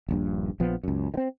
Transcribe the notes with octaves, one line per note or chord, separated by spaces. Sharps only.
D#1 A#1 G2
A#1 F3 B3
C#2 F#2
D#3 C4